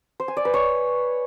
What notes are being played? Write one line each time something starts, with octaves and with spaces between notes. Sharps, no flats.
C5
G#5
D5
B4
C#5